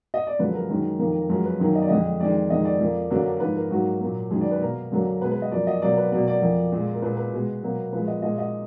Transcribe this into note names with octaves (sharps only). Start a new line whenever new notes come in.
D#5
D5
F#2 D3 F3 G#3 B4
A#4
F#2 D#3 G#3
F2 D#3 A#3
F#2 F3 G#3 A#4
B4
F#2 D#3 F#3 A#3
D#5
D5
F2 D3 G#3 D#5
F2 D#3 G#3 D5
F2 D#3 G#3 D#5
D5
F2 F3 A#3
F#2 D3 F#3 A#3
G#2 F3 A#3 B4
A#4
G#2 F#3 A#3 F#4
A#2 F#3 A#3
F#2 D#3 G#3 G#4
D5
B4
B2 A#3 A#4
F#2 D3 F#3 A#3
B2 G#3 B4
B4
D#5
F#2 F3 A#3 D5
D#5
B2 F#3 A#3 D5
B4
B2 F#3 A#3 D5
D5
F2 F3 A#3
A#2 G#3
A#4
A#2 G#3 B4
B4
B2 G#3
B2 F#3 A#3
A#2 F3 G#3 B4
D#5
A#2 G#3 D#5
D#5